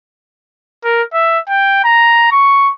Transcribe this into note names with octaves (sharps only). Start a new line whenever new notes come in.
A#4
E5
G5
A#5
C#6